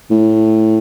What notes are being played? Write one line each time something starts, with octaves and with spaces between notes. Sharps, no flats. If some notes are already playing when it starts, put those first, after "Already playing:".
A2